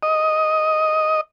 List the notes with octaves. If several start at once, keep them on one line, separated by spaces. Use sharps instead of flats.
D#5